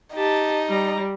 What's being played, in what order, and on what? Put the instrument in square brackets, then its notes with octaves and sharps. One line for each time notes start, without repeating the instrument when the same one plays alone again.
[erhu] D#4 [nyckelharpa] G4 A5
[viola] G3 [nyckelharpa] A#5